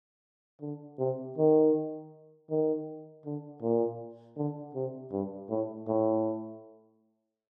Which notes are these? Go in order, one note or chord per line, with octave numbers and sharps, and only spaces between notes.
D3
C3
D#3
D#3
D3
A#2
D3
C3
G2
A2
A2